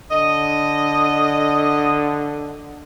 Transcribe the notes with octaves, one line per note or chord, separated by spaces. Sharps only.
D3 D#5